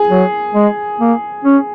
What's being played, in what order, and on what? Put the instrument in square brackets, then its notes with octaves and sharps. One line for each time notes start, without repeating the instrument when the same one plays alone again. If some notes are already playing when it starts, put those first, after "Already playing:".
Already playing: [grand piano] G#4
[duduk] F#3
G#3
A#3
C#4